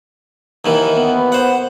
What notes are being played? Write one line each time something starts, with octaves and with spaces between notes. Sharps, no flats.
D#2 D#3 E3
B3
C5 F#5